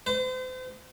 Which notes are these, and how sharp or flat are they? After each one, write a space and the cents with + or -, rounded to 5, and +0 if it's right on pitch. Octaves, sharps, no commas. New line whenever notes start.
C5 -40